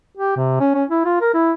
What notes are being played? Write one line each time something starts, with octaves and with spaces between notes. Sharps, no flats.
G4
C3
C#4
C#4
E4
F4
A#4
E4